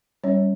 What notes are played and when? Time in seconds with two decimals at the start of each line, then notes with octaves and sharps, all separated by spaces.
0.24 G3 C#4 C#5